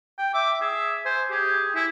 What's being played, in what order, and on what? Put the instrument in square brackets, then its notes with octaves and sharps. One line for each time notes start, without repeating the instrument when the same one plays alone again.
[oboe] G5
[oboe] E5 [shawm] D6
[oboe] G#4 [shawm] E5
[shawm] C5 [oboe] G#5
[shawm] G4 [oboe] G#4
[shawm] E4 [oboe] G#5